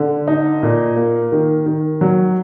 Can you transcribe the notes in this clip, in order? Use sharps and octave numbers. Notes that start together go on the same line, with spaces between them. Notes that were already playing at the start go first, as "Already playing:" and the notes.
Already playing: D3
D#4
A#2
A#3
D#3
D#3
F#3